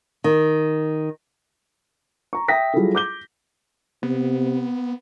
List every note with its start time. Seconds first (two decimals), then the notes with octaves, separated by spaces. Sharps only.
0.24 D#3
2.33 A#5 C#6
2.48 E5 G5 D#6 A#6 B6
2.74 F#3 G3 E4 F4 G#4 A4
2.95 D6 G6 G7
4.03 C3 B3